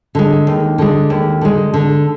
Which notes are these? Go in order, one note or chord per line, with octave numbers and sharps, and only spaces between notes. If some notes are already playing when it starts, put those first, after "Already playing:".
D3 G#3
D#2
D3 G#3
D#2
D3 G#3
D3